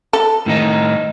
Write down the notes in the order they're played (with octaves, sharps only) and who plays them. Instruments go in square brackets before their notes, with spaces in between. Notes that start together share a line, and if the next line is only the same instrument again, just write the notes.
[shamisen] A4
[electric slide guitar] A2 D#3 D#4